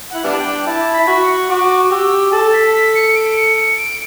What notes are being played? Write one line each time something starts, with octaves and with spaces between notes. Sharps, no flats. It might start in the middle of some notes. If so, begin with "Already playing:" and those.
E4 F#5
G3 B3 D4
A5
G5
E4 A5
B5
E4
F#4
C#6
F#4 D6
G4 E6
A4 A6
B6
B6
C#7
D7
C#7
C#7
D7